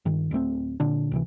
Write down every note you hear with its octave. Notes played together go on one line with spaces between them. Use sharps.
G2 D#3
D1 G2 A3 C4
A#2 D3 D4
C#2 C3 E3